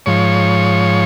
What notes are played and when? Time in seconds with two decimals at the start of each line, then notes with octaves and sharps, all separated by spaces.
0.06 G#2 F3 C#5